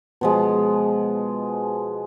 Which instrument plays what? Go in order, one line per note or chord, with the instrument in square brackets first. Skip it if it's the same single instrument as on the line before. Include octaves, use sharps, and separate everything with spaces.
[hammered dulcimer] B2 F3 G#3